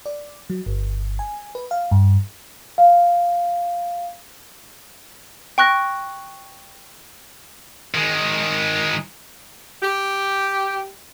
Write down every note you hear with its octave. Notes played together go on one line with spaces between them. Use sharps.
D5
F#3
G1
G#5
B4
F5
G2
F5
G5 C#6 F#6 A#6
D#3 G#3
G4